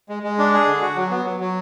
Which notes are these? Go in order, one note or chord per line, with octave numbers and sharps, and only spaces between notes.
G#3
G#3
D4
G#4
D3
F#4
F#3
B3
F#3
F#3